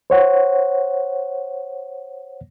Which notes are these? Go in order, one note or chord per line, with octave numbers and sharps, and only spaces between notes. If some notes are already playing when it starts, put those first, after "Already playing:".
C5 C#5 F#5